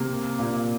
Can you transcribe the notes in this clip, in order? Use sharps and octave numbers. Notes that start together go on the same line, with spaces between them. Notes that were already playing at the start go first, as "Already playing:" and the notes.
Already playing: C3 A#3
A#2